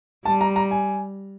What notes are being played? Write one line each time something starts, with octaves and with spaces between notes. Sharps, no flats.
G3 A5
A#5
A#5
G#5